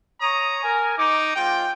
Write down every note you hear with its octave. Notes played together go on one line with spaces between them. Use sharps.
C#5 A#5 C#6 D#6
A#4 G#5
D#4 D6
G#3 C4 F4 G5